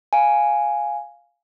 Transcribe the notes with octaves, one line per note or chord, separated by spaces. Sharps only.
F5 G#5